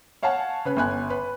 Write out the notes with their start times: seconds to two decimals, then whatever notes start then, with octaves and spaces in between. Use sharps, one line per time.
0.23 C#5 F5 F#5 G#5 A5
0.65 C#3 B4
0.77 G1 G#5 F#6
1.10 B4